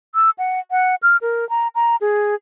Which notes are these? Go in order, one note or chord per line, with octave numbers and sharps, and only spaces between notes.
E6
F#5
F#5
F6
A#4
A#5
A#5
G#4